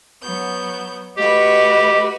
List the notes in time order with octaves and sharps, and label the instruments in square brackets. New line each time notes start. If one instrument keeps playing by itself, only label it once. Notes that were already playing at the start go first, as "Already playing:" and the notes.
[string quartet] F#3 B3 G6
[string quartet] A3 F#4 B4 [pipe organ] G4 [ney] D#5